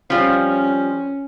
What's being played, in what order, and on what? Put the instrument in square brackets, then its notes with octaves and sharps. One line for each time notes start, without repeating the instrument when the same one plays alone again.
[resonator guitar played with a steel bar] F3 G3 [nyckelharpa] C#4